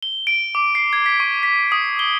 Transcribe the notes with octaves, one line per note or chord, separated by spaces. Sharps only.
G7
D7
D6
C7
G#6
B6
C#6
B6
D#6
G7